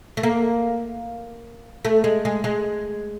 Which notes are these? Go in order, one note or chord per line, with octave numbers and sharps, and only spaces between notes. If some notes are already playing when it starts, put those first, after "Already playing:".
A3
A#3
A3
G#3
G#3
G#3